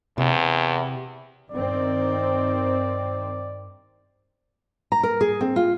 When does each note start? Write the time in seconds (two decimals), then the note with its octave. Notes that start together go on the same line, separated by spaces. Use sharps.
0.18 E2 C3
1.52 G2 D#3 C4 D5
4.92 A#5
5.03 A#4
5.21 G#4
5.41 C4
5.56 F4